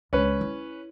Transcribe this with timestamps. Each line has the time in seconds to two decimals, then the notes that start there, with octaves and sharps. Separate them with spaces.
0.13 C#2 C#4 B4
0.41 E4